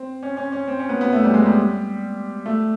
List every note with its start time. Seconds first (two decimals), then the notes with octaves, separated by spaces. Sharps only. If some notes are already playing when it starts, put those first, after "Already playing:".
Already playing: C4
0.23 C#4
0.37 C#4
0.52 C#4
0.68 C4
0.79 C#4
0.89 B3
1.01 B3
1.13 A3
1.24 G3
1.34 G#3
1.46 G3
2.46 A3